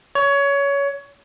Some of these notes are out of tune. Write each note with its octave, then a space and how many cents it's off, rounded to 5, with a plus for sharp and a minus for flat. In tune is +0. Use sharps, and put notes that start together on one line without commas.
C#5 +20